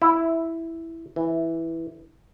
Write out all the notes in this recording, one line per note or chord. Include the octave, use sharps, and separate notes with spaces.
E4
E3